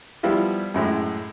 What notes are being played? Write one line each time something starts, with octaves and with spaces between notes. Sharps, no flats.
F3 G3 B3 E4 F4 G4
F#2 A2 G#3